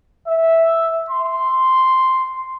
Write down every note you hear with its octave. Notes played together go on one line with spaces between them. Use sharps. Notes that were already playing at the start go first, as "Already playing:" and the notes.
E5
C6